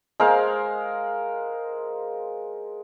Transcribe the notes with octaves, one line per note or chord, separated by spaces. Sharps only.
G#3 A#4 C5 F5